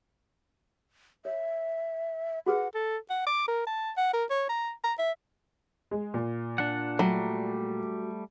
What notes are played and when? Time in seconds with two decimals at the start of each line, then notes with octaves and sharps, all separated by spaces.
1.25 C#5 E5
2.46 F#4 G#4 B4 F#5
2.74 A4
3.10 F#5
3.26 D6
3.48 A#4
3.67 A5
3.97 F#5
4.14 A#4
4.30 C#5
4.49 A#5
4.84 A#5
4.98 E5
5.91 G#3
6.14 A#2
6.58 D4 F#5
6.99 F#3 G3 A3